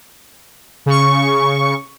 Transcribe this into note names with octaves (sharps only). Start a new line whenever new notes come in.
C#3 C#6